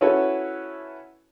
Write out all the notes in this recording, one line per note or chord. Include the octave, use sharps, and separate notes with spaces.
C#4 E4 F#4 A4 B4 C#5